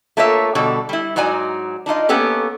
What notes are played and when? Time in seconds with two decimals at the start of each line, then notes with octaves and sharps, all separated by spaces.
0.17 A3 A#3 F4 A#4 C#5 E5
0.55 B2 D3 G3 A4
0.89 G3 E4
1.16 G#2 F#3 D#4 D5 G#5
1.86 D4 D#4 F4 D#5
2.09 A#3 B3 C#4 G4 A4